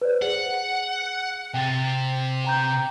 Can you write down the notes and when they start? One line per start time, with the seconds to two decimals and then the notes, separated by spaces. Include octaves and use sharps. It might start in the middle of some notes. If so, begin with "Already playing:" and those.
0.01 B4 C5 D5
0.22 G#4 F#5
1.54 C3 G5 A6
2.44 G5 A#5 G6